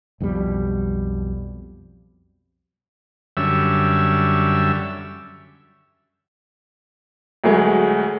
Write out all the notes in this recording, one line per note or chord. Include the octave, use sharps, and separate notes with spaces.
B1 F2 B2 G3
F#2 D3 G3 C#4 E5 E6
D2 F#3 G#3 A3